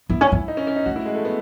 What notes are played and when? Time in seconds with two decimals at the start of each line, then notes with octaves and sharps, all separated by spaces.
0.09 B3 E4
0.21 C#4
0.32 B3
0.48 D#4
0.57 C#4
0.67 C#4
0.76 D#4
0.86 A3 F#4
0.96 E4
1.06 G#3
1.15 A3
1.25 B3